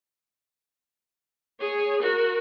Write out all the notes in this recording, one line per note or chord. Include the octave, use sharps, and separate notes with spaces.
G#4 C#5
F#4 A#4